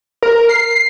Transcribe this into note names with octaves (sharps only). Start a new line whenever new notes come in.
A#4
C7